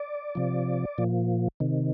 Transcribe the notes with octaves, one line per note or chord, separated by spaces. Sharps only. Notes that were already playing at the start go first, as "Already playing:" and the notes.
Already playing: D5
C3 F3
A#2 F3
C3 D#3